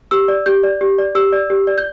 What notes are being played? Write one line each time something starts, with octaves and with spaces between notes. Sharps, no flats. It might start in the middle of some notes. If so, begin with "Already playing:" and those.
G4 E6
D5
G4 G6
D5
G4
D5
G4 E6
D5
G4
D5
G6